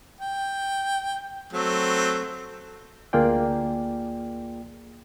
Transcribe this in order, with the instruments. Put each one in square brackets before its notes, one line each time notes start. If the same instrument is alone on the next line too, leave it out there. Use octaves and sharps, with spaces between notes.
[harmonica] G5
F#3 A3 C4
[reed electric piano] D2 A#3 F4 G#4 D5 G5